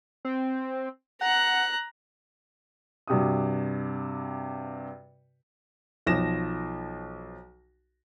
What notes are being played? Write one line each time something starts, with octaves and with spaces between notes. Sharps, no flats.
C4
F#5 A#5 F#6
G2 C3 F#4 D#6
B1 F3 A#6 E7